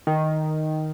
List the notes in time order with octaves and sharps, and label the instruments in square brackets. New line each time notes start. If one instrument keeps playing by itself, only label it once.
[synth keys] D#3